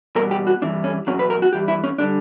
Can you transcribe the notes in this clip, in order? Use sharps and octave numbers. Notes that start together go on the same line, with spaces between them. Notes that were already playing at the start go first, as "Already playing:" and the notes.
E2 B2 G3 A#4
G4
F#4
G2 E3 G3 D4
C#4
E2 B2 F#3 C#4
B4
A#4
F#4
G2 E3 G3 G4
E4
C#4
D3 G3 D4